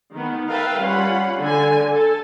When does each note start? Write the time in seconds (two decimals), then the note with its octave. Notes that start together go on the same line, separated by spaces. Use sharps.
0.15 D#3 B3
0.49 A#4 B4 E5 F5 G5 A5
0.80 G3 C#4 F4 F#5 B5
1.40 D3 G#5
1.93 A4 A5